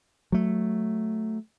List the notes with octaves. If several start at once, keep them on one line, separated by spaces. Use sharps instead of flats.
F#3 A3